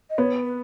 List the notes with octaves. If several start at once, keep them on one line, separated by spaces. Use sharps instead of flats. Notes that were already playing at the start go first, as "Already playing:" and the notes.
D#5
B3 C#5
B4